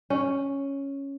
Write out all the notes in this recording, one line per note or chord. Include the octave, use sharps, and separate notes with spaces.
C#4